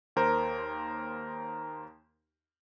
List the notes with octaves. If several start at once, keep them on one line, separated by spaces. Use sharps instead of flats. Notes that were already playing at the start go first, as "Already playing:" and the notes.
D#2 A#4 C5